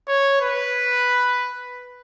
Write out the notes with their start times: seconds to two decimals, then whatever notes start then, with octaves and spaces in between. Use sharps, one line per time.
0.08 C#5
0.41 B4